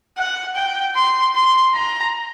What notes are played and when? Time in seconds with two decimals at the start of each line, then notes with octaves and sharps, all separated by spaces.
0.17 F#5
0.56 G5
0.96 C6
1.35 C6
1.75 A#5